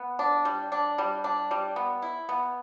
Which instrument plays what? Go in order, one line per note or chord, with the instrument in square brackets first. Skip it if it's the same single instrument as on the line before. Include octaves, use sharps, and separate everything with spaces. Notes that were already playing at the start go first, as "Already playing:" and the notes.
Already playing: [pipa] B3
D4
G3
D4
G3
D4
G3
B3
E4
B3